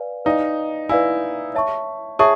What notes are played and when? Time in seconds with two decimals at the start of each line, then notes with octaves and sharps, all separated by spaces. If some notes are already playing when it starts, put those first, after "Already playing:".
Already playing: B4 D5 F5 G#5
0.25 D#4 B4 D5 F5 G#5
0.89 E4 B4 D5 F5 G#5
1.55 C#5 E5 A5 C#6
2.19 G#4 C#5 E5 A5 C#6